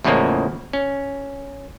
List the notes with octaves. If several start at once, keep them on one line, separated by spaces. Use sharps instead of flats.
E2 A2 C#3 F3 G#3 A#3
C#4